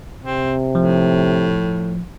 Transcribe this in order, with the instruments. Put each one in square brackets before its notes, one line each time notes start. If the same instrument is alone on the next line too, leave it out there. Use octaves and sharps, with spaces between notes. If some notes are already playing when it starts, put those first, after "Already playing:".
[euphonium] C3 [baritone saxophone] C4
[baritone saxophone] A2 [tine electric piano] F3